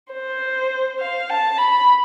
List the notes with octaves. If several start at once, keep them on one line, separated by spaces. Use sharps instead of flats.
C5
F5
A5
B5